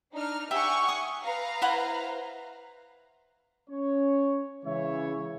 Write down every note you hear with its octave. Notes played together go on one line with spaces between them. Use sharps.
D4 D#4 F6
G4 E5 F#5 G#5 C#6
D#6
B4 F5 A#5
E4 C5 F#5
C#4 C#5
C#3 E3 G#3 C#5 E5